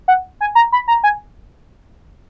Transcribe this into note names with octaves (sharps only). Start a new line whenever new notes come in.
F#5
G#5
A#5
B5
A#5
G#5